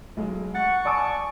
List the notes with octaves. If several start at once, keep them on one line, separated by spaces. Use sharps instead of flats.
B1 G#3
F#5 C#6 A6
D5 G#5 A5 D6 D#6 D7